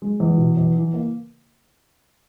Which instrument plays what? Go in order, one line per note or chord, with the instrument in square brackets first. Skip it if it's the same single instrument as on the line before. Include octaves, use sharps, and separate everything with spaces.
[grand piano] G#3
E2
B2
E2
E3
A#3